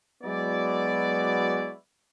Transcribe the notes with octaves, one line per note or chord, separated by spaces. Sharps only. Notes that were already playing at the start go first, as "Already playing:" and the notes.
F#3 G#3 B3 E4 F#4 D5